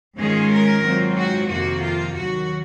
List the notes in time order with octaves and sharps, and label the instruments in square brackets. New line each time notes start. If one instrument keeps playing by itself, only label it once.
[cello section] G#2 D#3 G#3 C#4 F4 G#4
A#4
G#2 F#3 C4 F4
F#4
F2 C3 D#3 A#3 F#4
F4
D#2 D#3 F#3 F#4